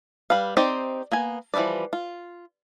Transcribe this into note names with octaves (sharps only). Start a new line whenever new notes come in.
G3 B4 F5
C4 D#4 G4 C5 D5
A#3 B3 G#5
E3 F3 G3 B4 D5
F4